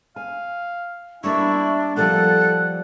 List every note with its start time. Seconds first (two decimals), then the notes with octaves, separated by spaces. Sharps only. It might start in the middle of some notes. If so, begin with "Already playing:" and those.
0.16 F5 G#5
1.24 G3 A#3 D4 E4 E5 C#6
1.97 F3 G3 A#3 A4 F#5 F#6